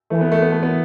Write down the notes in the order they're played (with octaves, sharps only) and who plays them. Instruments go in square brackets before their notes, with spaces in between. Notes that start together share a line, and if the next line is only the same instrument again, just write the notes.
[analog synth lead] E3 [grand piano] A3
[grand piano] B3
A3
B3
A3
B3